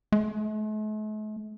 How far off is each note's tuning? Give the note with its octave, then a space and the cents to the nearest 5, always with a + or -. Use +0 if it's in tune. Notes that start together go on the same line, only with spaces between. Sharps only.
A3 -45